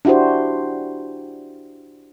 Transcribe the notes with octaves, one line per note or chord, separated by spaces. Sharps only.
D4 E4 F#4 G4 C5